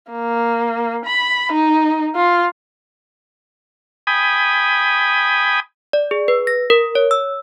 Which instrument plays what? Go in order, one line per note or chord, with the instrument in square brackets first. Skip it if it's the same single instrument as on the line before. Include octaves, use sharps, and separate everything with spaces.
[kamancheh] A#3
B5
D#4
F4
[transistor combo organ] G5 G#5 B5 D#6
[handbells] D5
G#4
B4
A#6
A#4
C#5
E6